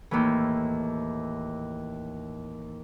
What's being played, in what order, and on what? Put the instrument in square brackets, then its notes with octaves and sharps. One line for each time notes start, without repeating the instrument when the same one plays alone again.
[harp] D#2 A2 E3